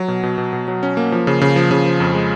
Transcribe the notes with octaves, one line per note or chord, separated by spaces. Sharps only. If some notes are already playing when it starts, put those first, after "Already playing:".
Already playing: F#3
B2
B2
B2
B2
F#3
C#4
A#3
F3
C#3
C#3
F3
C#3
F3
F2
G#3